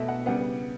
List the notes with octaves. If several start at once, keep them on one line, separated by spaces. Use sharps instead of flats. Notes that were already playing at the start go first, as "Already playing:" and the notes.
Already playing: B2 A3 E5
F#5
C#3 G3 B3 F#5